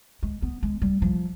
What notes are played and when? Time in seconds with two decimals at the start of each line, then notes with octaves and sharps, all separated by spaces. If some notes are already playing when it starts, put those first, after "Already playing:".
0.23 G#3
0.42 B3
0.63 G#3
0.82 G3
1.02 F3